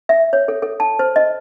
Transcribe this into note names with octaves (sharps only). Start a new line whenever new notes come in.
E5
C#5
A4
A4
A5
C5
D#5